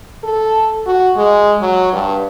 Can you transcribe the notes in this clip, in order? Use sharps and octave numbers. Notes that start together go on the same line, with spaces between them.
A4
F#4
G#3
F#3
G2